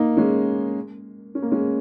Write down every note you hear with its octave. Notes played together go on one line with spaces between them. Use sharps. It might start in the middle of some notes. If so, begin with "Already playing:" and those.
Already playing: A#3 D#4
G#3 C#4
C#4
A#3
G#3 C#4